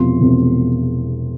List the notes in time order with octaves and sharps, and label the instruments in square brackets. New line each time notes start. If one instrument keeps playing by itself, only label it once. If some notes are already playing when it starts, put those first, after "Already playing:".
Already playing: [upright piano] E1 E2 C3 F3 C6
E1 E2 C3 F3